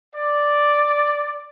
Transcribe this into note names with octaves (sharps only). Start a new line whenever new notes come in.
D5